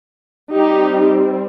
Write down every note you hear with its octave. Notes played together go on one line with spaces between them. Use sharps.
G3 C4 D#4 G4